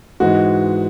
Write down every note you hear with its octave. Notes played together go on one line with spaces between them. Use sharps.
G#2 E3 G#3 F#4